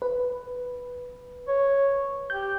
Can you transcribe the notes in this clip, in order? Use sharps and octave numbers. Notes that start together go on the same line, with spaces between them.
B4
C#5
G4 G6